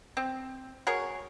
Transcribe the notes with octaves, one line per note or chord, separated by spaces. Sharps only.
C4
F#4 G#4 A#4 C#5